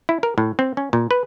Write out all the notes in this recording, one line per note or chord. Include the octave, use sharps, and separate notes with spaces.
E4
A#4
A2
C4
C#4
A#2
B4